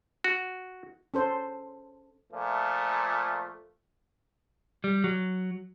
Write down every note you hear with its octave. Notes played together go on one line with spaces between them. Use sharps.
F#4
C#4 A4 C5
A#2 F3 A3
G3
F#3